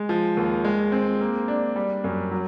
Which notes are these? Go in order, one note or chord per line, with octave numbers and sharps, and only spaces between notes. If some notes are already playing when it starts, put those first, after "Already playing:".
Already playing: G#3
F3
D#2
G#3
C4
A#3
D4
G3
F#2
F#3